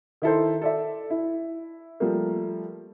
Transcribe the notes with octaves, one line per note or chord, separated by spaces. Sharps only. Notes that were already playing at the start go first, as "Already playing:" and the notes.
D#3 E4 A4 C5
A4 D5 E5
E4
F3 G3 A3 A#3